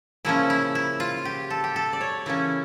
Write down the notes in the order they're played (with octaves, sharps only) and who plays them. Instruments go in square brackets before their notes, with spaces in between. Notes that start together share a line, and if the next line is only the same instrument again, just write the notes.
[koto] C#3 F3 A#3 C#4 E4
E4
E4
F4
G4
A4
G4
A4
D5
C#5
C#3 E3 A#3 C#4 E4